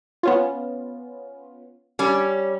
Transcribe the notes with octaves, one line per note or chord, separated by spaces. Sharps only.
B3 C#4 F4
G3 C#4